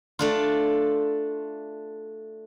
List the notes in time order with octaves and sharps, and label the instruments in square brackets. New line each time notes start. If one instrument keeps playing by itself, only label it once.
[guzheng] A3 D4 F4